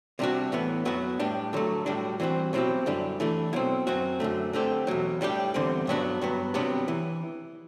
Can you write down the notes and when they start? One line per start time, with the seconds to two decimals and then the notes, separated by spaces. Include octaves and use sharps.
0.19 C3 G3 D4 F#4
0.52 A2 E3 B3
0.85 F#2 F#3 B3 F#4
1.19 A2 G3 D4 G4
1.53 D3 F#3 A3
1.86 A2 G3 D4 F#4
2.20 E3 G3 C4 F#4
2.53 B2 F#3 C4 E4 G4
2.86 F#2 D3 G3 D4
3.20 E3 A3 D4
3.53 B2 F#3 C4
3.87 F#2 F#3 C4 F#4
4.20 F#2 D3 A3
4.53 D3 A3 C4 G4
4.87 E2 B2 F#3
5.21 A2 G3 D4 G4
5.54 E2 D3 G3 C4
5.87 G2 F#3 B3 D4 F#4
6.21 G2 F#3 B3
6.54 C3 F#3 B3 D4 G4
6.88 E3